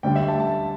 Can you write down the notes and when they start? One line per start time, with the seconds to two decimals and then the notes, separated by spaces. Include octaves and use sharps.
0.03 D2 D3 G3 G5
0.16 E5
0.28 A5
0.40 A5